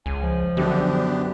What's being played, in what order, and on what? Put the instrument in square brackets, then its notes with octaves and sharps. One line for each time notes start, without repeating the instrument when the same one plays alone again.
[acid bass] C#2 [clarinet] G#5
[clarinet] F3
[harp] F#2 [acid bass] D3 [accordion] B3 D4 G4